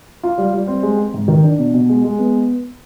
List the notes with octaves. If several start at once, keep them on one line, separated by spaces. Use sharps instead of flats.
F4
G3
G3
C4
G#3
C4
G#2
D#3
D4
B2
B2
G#3
G#3
B3